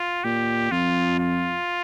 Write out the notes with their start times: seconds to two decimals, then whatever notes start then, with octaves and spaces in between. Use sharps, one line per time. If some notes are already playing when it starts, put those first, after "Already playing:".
Already playing: F4
0.24 A#2 G4
0.71 F2 F4
1.19 F4